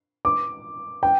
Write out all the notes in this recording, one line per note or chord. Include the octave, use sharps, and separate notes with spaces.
D6
G5